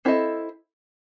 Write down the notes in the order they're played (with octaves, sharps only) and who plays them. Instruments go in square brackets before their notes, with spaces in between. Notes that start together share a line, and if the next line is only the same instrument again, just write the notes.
[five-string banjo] C4 E4 A4 D#5